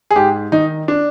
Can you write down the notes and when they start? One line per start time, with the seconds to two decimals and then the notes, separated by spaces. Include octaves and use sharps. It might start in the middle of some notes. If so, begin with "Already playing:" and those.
0.11 G#4
0.16 G#2 G4
0.52 D#3 D#4
0.88 D4